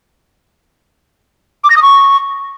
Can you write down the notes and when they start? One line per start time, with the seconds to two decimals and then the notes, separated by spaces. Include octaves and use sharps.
1.64 D6
1.70 A#6
1.76 D#6
1.82 C#6